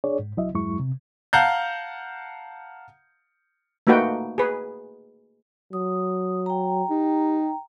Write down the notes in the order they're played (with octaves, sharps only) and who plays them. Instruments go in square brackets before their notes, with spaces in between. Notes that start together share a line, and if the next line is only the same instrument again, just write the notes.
[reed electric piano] D4 G#4 C#5 D5
G#2
C2 F#3 E4 D#5 E5
E2 G2 F#3 G#3 E4 C#6
C3
[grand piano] F5 F#5 A5 A#5 F#6 G6
[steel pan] A3 A#3 D#4 F#4 B4 G5
G#4 B4
[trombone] F#3 [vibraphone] D#6
[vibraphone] G5 A#5
[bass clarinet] D#4 [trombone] G4